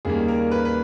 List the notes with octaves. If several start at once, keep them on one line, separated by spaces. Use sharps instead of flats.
D#2 C#3 G3 A#3 G#4
A#4
B4
B4